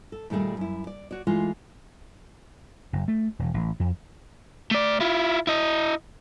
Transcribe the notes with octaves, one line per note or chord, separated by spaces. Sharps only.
A4
D#2 A#2 G3 A3 G#4
F#2 E4
D5
F#4 C#5 D5
E3 G#3 A3 F4
F#1
A3
E1
A1
F2
A3 D5
E4 F4
E4 D#5